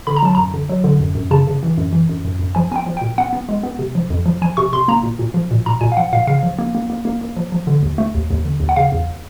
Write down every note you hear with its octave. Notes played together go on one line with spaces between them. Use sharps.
D3 B5
A#5
F#3 A5
F#2 A#5
D3
F#3
D3
F#2
F#2
C#3 A5
C#3
E3
F#2
E3
F#2
F#2
F#2
F3 G#5
B3 G5 G#5
F3
A#2 G5
B3 F#5
B3
G#3
B3
C3
F3
F2
F3
F3 G#5
C3 C#6
C3 C6
A#3 A#5
A#2
A#2
F3
A#2
A#2 A#5
A#2 G#5
F5
F3 F#5
A#2 F5
C#3 F5
F3
A#3
A#3
A#3
A#3
A#3
F3
F3
D3
D#2
A3
D#2
D#2
D3
D#2
F#5
C#3 F5
E2